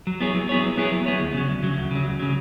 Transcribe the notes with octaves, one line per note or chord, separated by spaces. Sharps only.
F#3
B3 E4 G#4 C#5
F#3
B3 E4 G#4 C#5
F#3
B3 E4 G#4 C#5
F#3
B3 E4 G#4 C#5
D2
C#3 F#3
D2
C#3 F#3
D2
C#3 F#3
D2
C#3 F#3